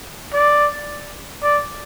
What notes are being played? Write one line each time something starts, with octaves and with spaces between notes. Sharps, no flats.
D5
D5